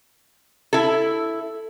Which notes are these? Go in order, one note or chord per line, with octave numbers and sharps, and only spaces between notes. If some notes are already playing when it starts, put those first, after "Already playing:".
E4 A4